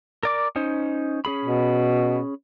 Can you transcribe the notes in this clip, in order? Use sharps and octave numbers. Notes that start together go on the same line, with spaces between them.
A#4 D5 D6
C#4 D#4 C5
C#4 G#4 B5
B2